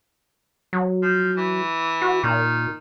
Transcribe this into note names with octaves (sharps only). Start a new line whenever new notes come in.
F#3
F3
E3
F#4
A#2 D#3